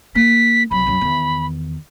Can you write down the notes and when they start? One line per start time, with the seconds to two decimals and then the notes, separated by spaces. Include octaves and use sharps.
0.15 A#3 B6
0.71 C2 F#3 B5
0.87 F#2 F#3
1.01 E2 D#3